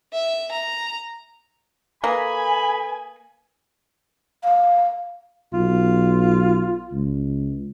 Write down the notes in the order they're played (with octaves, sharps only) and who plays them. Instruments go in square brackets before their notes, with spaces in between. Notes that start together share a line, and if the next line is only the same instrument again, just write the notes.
[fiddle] E5
A#5
[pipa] A#3 [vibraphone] A4 B4 D#6 [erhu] G#5 [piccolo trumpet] B5
[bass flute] F5
[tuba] B1 [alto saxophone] F4
[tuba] C#2